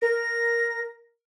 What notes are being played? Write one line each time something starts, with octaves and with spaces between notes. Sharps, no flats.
A#4 A#6